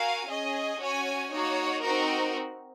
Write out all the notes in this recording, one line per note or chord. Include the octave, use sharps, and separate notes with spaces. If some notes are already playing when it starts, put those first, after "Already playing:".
Already playing: F#4 A#4 F5 G#5
C#4 G#4 D#5 G#5
C#4 F#4 C#5 G#5
A#3 D#4 F#4 C#5
C4 D#4 F#4 A#4